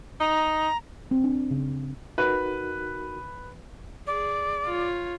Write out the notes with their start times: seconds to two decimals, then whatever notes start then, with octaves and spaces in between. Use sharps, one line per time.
0.20 D#4 A#5
1.11 C4
1.24 D4
1.51 C#3
2.18 D#4 F#4 A#4 B4
4.07 G#4 D5
4.65 F4 C#5